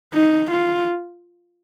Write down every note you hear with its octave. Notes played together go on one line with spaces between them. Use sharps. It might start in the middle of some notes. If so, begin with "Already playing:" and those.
D#4
F4